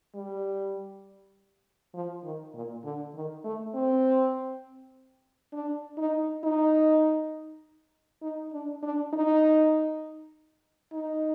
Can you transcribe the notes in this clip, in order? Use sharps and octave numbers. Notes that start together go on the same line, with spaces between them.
G3
F3
D#3
A#2
D3
D#3
A3
C4
D4
D#4
D#4
D#4
D4
D4
D#4
D#4